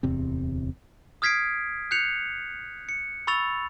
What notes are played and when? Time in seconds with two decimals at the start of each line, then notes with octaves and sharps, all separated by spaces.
0.03 D1 E2 C3 C4
1.22 D#6 F6 G#6 B6 C7 D7
1.91 F#6 G6 C7 C#7 F7
2.89 C#7
3.27 B5 C#6 E6 A6 F7